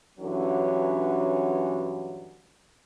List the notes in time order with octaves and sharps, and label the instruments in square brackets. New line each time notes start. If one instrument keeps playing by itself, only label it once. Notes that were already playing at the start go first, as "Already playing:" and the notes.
[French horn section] G2 D3 E3 F#3 A3 C#4